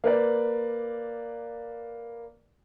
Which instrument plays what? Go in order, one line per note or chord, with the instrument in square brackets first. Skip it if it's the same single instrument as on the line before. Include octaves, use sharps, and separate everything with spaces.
[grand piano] A#3 B4 D5